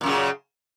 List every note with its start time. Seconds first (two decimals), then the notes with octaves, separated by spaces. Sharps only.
0.01 A#2
0.03 F#2
0.06 C#3